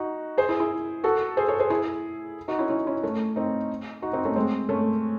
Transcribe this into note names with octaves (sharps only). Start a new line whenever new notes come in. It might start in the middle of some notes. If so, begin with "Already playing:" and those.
Already playing: D#4 F#4
G#4 C5
E4 G#4
E4 G#4
F#4 A4
G#4 C5
A4 C#5
G#4 C5
E4 G#4
D#4 F#4
C#4 E4
C#4 E4
C#4 E4
A3 C#4
C4 D#4
D#4 F#4
C4 D#4
A3 C#4
G#3 C4
A3 C#4